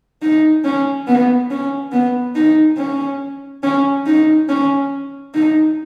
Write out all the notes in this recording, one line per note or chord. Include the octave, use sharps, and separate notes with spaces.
D#4
C#4
B3
C#4
B3
D#4
C#4
C#4
D#4
C#4
D#4